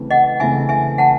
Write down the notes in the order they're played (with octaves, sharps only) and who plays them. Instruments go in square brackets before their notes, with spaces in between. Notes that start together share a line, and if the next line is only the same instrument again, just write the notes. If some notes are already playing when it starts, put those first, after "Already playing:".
Already playing: [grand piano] C#3 E3 A3 C4
[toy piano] D#5 F#5
[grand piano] C#3 E3 A3 C4 [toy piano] E5 G#5
[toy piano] E5 G#5
F#5 A5